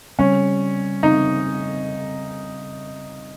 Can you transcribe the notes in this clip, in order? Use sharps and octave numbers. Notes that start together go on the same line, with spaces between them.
C#3 G3 C4 C#4
C#3 G3 C4 D#4